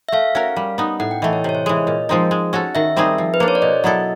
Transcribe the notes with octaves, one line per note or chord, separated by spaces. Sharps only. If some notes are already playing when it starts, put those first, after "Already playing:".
E5
A3 F5
C#4 F#4 A#4
G3
B3 D#4
A2 F#5
G5
E3 A3 D#5
C#5
C3 C#5
C5
E3 G#3 C#5
D#5
A#2 D#5
F3 G#3 C4 D#4
G#3
C#4 F#4 A4
D#3 E5
G3 C4 D#4 G#4
F3
B4
A#3 D4 C5
C#5
D5
B2 D#5
F#3 B3 E4 A4